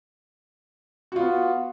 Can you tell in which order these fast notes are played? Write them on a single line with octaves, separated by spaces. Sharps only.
F#4 F4 B3